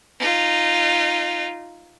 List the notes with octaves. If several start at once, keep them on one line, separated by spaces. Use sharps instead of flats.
D#4 F4